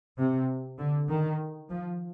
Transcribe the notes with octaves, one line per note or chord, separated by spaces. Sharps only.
C3
D3
D#3
F3